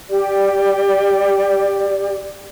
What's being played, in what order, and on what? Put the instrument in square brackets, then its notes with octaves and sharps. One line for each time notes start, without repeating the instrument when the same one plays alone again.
[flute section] G4 D5